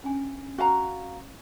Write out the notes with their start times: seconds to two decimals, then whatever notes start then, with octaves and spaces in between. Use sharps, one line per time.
0.04 C#4 D4 G#5
0.58 F#4 F5 A#5